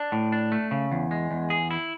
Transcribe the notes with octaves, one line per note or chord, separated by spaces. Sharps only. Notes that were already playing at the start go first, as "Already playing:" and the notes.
Already playing: D4
A2
D4
A3
C#3
E2
G#3
E2
G#4
E4